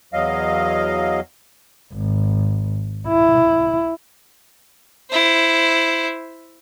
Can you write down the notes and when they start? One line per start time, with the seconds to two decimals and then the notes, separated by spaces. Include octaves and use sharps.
0.13 E2 F#3 D#5 F5
1.93 G#1
3.08 E4
5.11 E4 C5